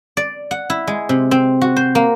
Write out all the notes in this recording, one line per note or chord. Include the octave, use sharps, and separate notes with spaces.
D5
F#5
E4
G#3
C3
C4
F#4
C5
A#3